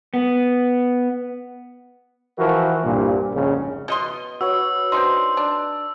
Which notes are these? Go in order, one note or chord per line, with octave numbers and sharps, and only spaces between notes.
B3
E3 F3 F#4 A#4
C2 G2 A#2
A#1 F2 G#2 C#3
B2 D#5 C6
F#4 B4 C#5 E6
C4 D4 D#4 C6
D4